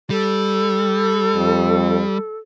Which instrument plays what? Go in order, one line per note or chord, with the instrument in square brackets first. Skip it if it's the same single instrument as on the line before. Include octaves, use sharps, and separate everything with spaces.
[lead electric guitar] G3 [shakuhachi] A4
[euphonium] F2